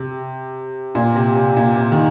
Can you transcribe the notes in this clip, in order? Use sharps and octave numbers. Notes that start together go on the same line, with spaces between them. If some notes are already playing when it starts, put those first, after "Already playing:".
Already playing: C3
A#2
C3
C3
A#2
C3
D#3